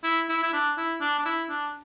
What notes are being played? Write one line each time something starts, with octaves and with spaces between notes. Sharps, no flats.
E4
E4
E4
D4
E4
D4
D4
E4
D4